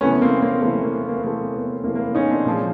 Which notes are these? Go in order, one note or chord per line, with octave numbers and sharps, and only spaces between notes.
C3 E3 A3 B3 C#4
C#4
A#3 C4
A#3 C4
C3 E3 A3 A#3
A#3
A#3
B3
C3 E3 A3 A#3 C4
B3
C3 E3 A3 A#3
A#3
B3
C#4 D#4
C4 D4
A#2 F3 G#3